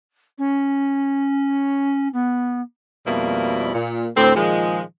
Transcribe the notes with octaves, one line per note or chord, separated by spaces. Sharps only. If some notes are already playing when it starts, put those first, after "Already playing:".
C#4
B3
F2 B2 G3 A#3 E4
A#2
D2 A2 A3 C4
A#2 D#3 F3 G#3